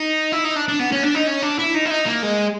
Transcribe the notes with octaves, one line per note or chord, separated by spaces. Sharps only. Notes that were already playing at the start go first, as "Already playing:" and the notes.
Already playing: D#4
E4
D#4
D4
D4
B3
C#4
D4
D#4
C#4
D4
E4
D#4
E4
D#4
A#3
G#3